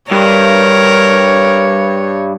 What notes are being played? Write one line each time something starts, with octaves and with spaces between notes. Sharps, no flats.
G2 A#4 C#5